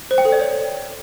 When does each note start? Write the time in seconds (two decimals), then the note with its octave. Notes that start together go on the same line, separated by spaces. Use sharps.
0.11 C5
0.18 G5
0.25 A4
0.32 D5
0.40 C#5